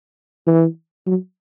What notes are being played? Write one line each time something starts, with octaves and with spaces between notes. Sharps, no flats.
E3
F#3